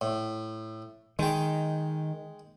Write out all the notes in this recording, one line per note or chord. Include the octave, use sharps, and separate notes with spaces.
A2
D#3 G#3 G5